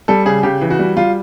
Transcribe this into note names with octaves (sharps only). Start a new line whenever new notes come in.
G3 A4
C#3 G#4
C#3 G4
E3
F#4
G3
G3 F4